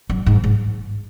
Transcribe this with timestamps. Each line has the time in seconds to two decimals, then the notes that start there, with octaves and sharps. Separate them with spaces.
0.10 F#2
0.26 G#2
0.44 G#2